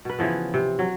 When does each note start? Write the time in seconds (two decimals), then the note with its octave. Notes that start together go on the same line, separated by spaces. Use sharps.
0.05 B2 B4
0.19 C#3 E3 F3 B3
0.54 C3
0.79 F#3